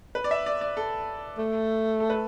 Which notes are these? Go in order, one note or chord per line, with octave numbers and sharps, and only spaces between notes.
B4
D5
E5
D5
D5
A4
A3
A4
B4